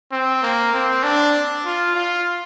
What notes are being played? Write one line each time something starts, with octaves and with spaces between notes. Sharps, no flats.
C4
A#3
C4
D4
F4
F4